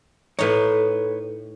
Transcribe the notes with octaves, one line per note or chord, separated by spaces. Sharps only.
A2 D#4 B4 C#5